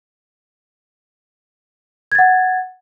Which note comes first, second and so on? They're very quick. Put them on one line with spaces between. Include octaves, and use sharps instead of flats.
G#6 A6 F#5